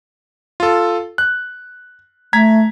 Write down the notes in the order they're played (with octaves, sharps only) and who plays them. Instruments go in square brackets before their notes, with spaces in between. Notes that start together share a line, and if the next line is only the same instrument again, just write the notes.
[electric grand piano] F4 A4
F#6
[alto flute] A3 [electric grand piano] A#5 G#6 B6